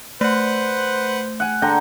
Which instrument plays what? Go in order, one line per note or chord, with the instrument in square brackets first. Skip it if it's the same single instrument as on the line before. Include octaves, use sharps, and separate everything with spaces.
[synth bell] A3 [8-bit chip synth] B4 F#5 [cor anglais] C5
[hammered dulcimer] F#5 G#5
D3 G5 A#5